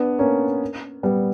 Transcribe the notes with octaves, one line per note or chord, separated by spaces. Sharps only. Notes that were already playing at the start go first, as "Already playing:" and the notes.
Already playing: B3 D4
A#3 C#4
G3 B3